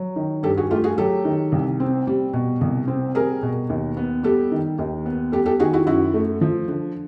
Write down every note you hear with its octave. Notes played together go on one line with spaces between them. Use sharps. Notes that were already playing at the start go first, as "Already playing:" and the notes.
Already playing: F#3
D#3
G2 G4 A4
F#4 G#4
A3 F4 G4
F#4 G#4
F#3 G4 A4
D#3
C2
C4
G3
B2
C2
C4
G3 G#4 A#4
B2
D#2
B3
G3 G4 A4
D#3
D#2
B3
G3 G4 A4
G4 A4
D#3 F#4 G#4
E4 F#4
F#2 E4 F#4
A3
F3
D3